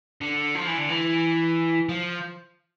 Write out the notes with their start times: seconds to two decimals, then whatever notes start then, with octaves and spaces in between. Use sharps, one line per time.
0.21 D3
0.55 F3
0.66 E3
0.78 D3
0.88 E3
1.89 F3